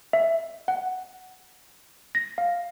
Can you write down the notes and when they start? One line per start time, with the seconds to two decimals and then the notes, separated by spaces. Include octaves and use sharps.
0.13 E5
0.68 F#5
2.15 A#6
2.38 F5